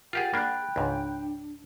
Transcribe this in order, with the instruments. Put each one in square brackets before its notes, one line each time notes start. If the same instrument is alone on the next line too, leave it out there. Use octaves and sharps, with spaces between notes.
[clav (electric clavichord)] F4 G4 G#4 [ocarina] A#4 [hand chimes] F#5 A6 [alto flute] G5
[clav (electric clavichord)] A#3 D4 [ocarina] G#4 [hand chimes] B5 F#6
[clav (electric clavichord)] C#2 G#2 [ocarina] D4